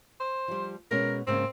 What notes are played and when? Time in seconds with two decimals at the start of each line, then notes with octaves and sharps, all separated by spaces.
0.20 C5
0.48 F3 G3
0.91 B2 G#3 C#4 A#4
1.27 G#2 C#3 A#3 C4